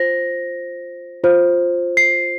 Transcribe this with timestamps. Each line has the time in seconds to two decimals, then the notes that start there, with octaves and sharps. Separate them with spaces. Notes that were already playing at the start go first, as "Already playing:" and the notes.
Already playing: F4 C5 A#6
1.24 F4 C5
1.97 C7